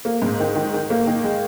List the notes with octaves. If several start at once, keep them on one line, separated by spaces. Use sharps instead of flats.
A#3
G#2
D#3
D#3
D#3
A#3
D#3
G#3